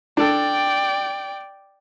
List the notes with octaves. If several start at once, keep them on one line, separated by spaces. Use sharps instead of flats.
D4 A4 D5 G5